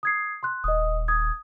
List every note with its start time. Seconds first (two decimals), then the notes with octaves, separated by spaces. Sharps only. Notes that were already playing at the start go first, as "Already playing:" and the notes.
0.03 D#6 G#6 C7
0.43 C6 F#6
0.64 D#1 D#5 D#6
1.08 D#6 G#6